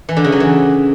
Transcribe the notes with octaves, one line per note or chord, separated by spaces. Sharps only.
E3
D3
C#3
F#3
E3